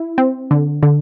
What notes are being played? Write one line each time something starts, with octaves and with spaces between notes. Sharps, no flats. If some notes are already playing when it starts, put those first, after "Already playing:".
Already playing: E4
C4
D3
D3